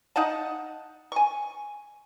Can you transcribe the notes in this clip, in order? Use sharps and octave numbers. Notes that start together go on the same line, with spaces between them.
D#4 F5 F#5 A5
G#5 C#6